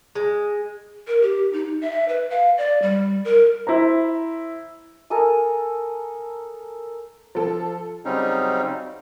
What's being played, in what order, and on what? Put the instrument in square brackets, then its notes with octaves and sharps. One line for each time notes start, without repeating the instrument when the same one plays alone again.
[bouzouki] G#3
[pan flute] A#4
G4
D#4
E5
B4
F5
D5
G3
A#4
[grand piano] E4 C5 A#5
[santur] A4 A#4 G#5 D#6
[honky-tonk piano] F3 A4
[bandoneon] C#3 F#3 G3 C4 C#4 D#4